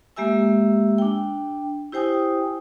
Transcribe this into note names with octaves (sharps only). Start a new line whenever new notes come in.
G#3 A#3 G4 E5 G#5 E6
D4 G5
E4 G4 C5 G5 G#5 D#6